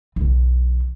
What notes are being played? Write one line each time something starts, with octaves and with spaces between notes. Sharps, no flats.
B1 E3